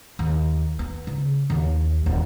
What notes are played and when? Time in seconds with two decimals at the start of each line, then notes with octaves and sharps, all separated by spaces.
0.19 D#2
0.79 B3
1.07 C#3
1.50 D#2
2.06 D#1